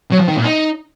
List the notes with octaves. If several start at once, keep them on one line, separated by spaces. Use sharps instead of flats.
F#3
F3
D#3
A#2
D#4